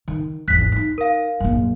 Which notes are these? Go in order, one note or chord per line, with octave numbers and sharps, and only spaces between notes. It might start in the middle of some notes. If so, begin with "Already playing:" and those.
D#3
G#1 E2 F#6 B6
D4 D#4
A#4 F5
A#1 F#2